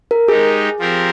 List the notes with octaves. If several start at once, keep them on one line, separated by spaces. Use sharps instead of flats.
A#4
G#3 D#4 G4 G#4
F3 C4 G4 A#4